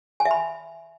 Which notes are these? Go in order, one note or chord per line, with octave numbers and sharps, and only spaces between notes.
G#5
E5
B5